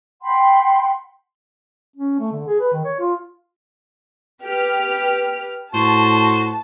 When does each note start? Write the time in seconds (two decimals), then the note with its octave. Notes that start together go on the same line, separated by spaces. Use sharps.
0.22 F#5 G5 B5 C6
1.96 C#4
2.19 A3
2.32 D3
2.47 G#4
2.60 B4
2.72 D#3
2.85 C#5
2.99 F4
4.44 G4 B4 F6
5.74 A2 F#4 C5 A5